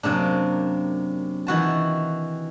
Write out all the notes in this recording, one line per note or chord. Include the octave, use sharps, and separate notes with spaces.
F#2 C3 A#3 D4
D#3 E3 F#4 A5